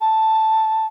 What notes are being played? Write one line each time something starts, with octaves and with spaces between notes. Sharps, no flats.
A5